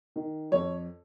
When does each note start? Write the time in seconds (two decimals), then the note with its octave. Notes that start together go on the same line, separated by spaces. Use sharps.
0.16 D#3
0.52 F2 C#5